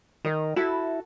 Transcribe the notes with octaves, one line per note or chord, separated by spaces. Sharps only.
D#3 A#4 D#5
E4 F#4 A4